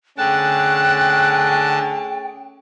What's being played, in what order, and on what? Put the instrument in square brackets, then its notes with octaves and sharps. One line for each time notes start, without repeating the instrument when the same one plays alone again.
[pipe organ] D3 A5 [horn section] A3 C#4 G#4 [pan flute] G5 [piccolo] F#6